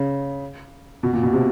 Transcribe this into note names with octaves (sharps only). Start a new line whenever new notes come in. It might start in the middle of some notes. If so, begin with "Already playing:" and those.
Already playing: C#3
B2
A#2
B2
C3